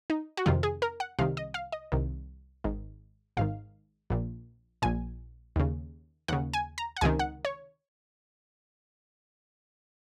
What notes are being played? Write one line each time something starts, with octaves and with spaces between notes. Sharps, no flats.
D#4
F#4
F2 C3 D#3 F4
G#4
A#4
F#5
C2 C3 D#3 F5
D#5
F5
D#5
C2 C3 D#3
G#1 G#2 D#3
G#1 G#2 D#3 F5
A#1 A#2
A#1 A#2 G#5
D#2 C#3
D#2 C#3 F#5
G#5
A#5
F#5
C#2 C3 D#3 G#5
F#5
C#5